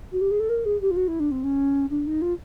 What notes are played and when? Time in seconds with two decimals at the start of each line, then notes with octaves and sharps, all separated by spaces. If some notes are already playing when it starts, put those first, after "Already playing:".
0.12 F#4
0.21 G4
0.31 G#4
0.40 A4
0.49 A#4
0.65 G#4
0.81 G4
0.91 F4
0.96 F#4
1.08 E4
1.20 D4
1.31 C4
1.44 C#4
1.90 D4
2.07 D#4
2.22 F4